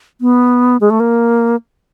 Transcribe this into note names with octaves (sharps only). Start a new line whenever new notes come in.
B3
G#3
A3
A#3